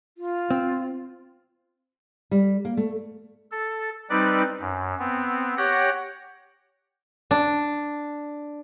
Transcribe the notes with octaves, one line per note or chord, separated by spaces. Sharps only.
F4
C4
G3
A#3
A3
A4
G3 C4 D#4 B4 D5
F#2
B3 C4
G4 C#5 F#5 G5 A#6
D4